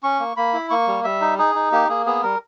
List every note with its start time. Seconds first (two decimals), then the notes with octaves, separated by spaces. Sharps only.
0.03 C#4 C#6
0.20 A#3
0.37 A#3 B5
0.54 E4
0.70 A#3 C#6
0.87 G3
1.04 G3 E5
1.21 D#4
1.39 D#4 G#4
1.55 D#4
1.72 A#3 G4
1.89 A#3 G#4
2.06 B3 G#4
2.23 G3 A#4